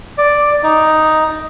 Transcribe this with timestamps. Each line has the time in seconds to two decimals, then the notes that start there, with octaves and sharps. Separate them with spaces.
0.18 D5
0.63 D#4